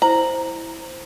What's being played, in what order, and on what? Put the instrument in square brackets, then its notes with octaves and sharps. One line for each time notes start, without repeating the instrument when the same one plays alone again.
[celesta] E4 C5 F#7 [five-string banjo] A#5